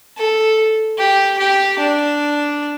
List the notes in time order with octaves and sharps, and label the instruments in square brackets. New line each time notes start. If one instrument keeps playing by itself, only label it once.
[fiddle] A4
G4
G4
D4